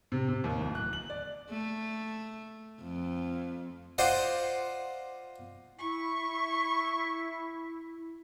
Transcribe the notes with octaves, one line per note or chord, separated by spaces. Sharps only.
C3
C3
D#2
D1
F#6
F#7
D5
A3
F2
F4 C5 D5 D#5 F#5
E4 C#6